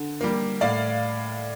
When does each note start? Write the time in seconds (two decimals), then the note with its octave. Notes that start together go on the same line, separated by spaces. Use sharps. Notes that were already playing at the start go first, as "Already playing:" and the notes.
Already playing: D3
0.21 G3 A#3
0.61 A2 D5 F5